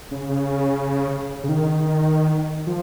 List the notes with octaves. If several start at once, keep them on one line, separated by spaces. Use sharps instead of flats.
C#3
C#3
D#3
F3